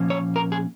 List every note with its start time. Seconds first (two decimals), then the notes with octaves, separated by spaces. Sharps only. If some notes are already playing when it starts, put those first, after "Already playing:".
Already playing: A#2 F3 A#3 C#4
0.10 C#5
0.36 A#4
0.52 G#4